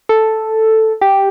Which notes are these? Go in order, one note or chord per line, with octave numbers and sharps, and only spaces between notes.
A4
G4